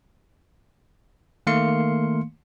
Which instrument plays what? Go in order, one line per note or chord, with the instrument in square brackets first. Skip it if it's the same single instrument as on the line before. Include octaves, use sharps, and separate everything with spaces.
[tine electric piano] D#3 A3 A#3 F5 C6 C#7